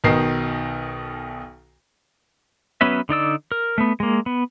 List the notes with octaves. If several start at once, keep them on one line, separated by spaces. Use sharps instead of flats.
B1 B2 D#3 C7
F#3 B3 C#4 B4 E5
D3 D#4 D5 E6
A#4
A3 B3
G#3 A#3
B3